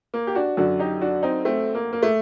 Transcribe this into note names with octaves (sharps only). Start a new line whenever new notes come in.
A#3
G4
D4 F#4
F#2 D3 F#3 D4 F#4
D#4 G4
D4 F#4
C4 D#4
A3 C4
A#3
A#3
A3